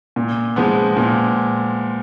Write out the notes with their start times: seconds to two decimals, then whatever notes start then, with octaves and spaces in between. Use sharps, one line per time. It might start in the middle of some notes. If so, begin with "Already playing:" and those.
0.16 A#2
0.56 F3 G#3 B3
0.97 A#2